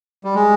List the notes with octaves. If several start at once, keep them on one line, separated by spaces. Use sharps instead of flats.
G3
G#3